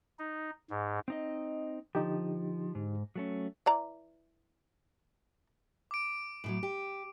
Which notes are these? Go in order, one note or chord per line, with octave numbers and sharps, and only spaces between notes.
D#4
G#2
C4 D#4 D#5
D3 F3 D#4 G4
G#2
F#3 A3 C#4
E3 D5 A#5
D6 D7
A2 E3 F#3
G4